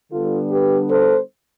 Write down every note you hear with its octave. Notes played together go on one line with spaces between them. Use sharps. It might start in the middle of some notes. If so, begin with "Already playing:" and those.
D3 G3 B3 D4 F4 A4
G4 B4
A4 C5